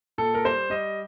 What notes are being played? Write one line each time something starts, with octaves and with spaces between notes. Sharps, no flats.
A#2 A4
A#4
G3 C5
G3 D#5